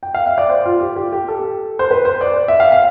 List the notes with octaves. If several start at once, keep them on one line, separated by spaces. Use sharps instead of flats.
G5
F5
E5
D5
C5
F4
G4
G4
G4
A4
C5
B4
C5
D5
E5
F5
F5